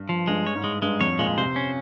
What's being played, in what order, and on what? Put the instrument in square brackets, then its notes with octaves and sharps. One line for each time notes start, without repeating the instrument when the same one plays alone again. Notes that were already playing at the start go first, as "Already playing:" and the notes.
Already playing: [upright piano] G2
[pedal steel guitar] F3
[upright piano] G2 [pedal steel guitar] G#3
[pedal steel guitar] C#5
[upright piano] G#2
[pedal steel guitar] G#3
[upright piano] G2 [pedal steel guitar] G#3
[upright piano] F2 [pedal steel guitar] C#5
[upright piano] A#2 [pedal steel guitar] G#3
[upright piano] C3 [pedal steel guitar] C5
[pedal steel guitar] C#4